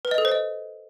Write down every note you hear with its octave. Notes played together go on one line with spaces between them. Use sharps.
B4
D#5
A4
C5
D#5